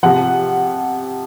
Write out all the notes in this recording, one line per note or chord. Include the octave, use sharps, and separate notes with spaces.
C3 F3 F#5